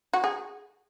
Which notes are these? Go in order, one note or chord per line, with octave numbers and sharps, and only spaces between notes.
F#4
G#4